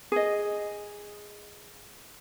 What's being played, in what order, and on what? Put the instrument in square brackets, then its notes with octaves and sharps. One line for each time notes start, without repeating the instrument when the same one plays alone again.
[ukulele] G#4 D#5